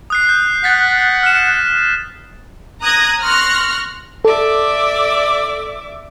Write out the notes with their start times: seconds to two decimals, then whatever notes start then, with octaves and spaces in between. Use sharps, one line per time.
0.10 D#6 F#6 C7
0.29 G6
0.64 F#5 F#6 A6 B6
1.23 F6 E7
2.82 A#5 D#6 F#6 G#6 A#6
3.22 C6 C#6 F6 F#6 A#6
4.25 A4 D5 E5 D6